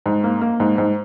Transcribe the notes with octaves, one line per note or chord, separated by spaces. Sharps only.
G#2
A#3
A#3
G#2
G#2